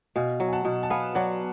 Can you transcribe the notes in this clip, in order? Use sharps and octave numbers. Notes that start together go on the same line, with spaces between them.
B2 F5 G#5
F#3
G#5
F#5 A5
B2
A5
B3 F5 G#5
F#3 D5 F#5